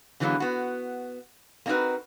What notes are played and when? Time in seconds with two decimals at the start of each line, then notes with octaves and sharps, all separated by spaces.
0.20 D3 E3 F#3 G#3 A#3 B3
0.40 B3 F#4
1.66 A#3 C4 D#4 F#4 A#4 B4